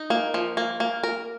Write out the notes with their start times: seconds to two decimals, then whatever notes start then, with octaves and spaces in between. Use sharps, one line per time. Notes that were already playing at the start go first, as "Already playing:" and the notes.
Already playing: D#4
0.10 A#3
0.34 F3
0.57 A#3
0.80 A#3
1.03 A#4